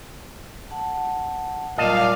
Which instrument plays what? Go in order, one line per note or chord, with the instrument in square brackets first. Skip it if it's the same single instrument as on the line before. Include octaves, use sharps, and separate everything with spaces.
[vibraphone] F#5 A5
[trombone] A#2 [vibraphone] F#3 G3 D6 [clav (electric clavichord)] D#5 A5 [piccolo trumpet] F5